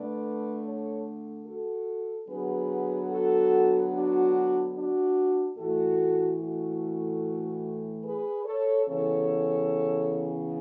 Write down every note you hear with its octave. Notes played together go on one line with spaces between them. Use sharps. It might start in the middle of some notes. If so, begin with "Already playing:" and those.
Already playing: D3 A3 B4 D5
A4 C#5
F#4 A4
D3 F#3 B3 G#4 B4
F#4 A4
D4 F#4
D4 F#4
A2 E3 A3 F#4 A4
F#4 A4
G#4 B4
A4 C#5
C#3 E3 B3 A4 C#5